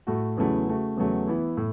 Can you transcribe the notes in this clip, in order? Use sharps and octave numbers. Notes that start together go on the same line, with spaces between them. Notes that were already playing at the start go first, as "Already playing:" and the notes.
A2 A3 F#4
E2 C#3 F#3 A3 E4
C#3 A3 F#4
E2 C#3 F#3 A3
E3 B3 E4
A2